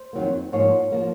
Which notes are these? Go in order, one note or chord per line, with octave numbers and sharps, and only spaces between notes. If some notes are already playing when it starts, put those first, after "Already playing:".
Already playing: C5
F2 D#3 F#3 A#3
G#2 F3 A#3 C#5
F3 A#3